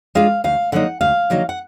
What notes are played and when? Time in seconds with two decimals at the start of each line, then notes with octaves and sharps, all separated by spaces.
0.15 G#3 D4 F4 F5
0.44 D2 F5
0.72 D3 F#3 A#3 D#4 F#5
1.01 D2 F5
1.30 D3 F#3 A#3 D#4
1.49 F#5